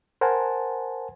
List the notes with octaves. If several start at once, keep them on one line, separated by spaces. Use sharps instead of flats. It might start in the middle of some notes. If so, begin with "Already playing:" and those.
A#4 C5 F#5 G#5 A5